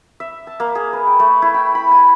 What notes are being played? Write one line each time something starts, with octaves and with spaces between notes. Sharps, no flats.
E5
A5
A#3
G#4
B4
G5
A3
E4
G5
B5
G#5